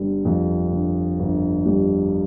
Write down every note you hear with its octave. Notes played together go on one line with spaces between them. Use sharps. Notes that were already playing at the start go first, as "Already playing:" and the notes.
Already playing: G1 D3 G3
F2
D3
G1
G3